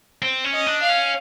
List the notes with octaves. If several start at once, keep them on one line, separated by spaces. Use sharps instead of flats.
C4
C#4
D#5
D4
F5
C#4